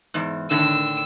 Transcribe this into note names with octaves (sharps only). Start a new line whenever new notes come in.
E2 G#2
A2 D3 D#3 E6